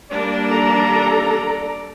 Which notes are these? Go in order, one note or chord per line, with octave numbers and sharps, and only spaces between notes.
G3 A#3 D4 D5
A4 A#5